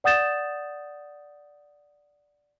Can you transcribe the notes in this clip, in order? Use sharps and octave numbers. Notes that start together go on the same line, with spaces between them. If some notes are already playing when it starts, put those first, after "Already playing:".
D5 F#5 D#6 G6 A6 E7